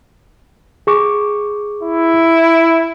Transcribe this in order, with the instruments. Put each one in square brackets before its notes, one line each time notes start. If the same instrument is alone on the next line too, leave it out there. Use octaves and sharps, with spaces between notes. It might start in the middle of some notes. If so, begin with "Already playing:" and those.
[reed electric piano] G#4 C#6 D6
[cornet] E4